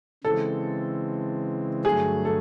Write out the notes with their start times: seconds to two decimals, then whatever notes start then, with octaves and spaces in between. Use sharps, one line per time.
0.24 C#3 E3 G#3 C4 A4
1.85 G2 D3 F#3 A3 G#4
2.25 A4